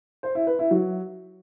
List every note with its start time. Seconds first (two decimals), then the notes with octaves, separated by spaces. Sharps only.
0.23 C5
0.35 E4
0.47 B4
0.59 E4
0.71 F#3